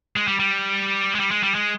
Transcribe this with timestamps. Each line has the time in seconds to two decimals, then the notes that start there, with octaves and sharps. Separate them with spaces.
0.16 G#3
0.28 G3
0.39 G3
1.15 G#3
1.20 G3
1.31 G#3
1.43 G3
1.55 G#3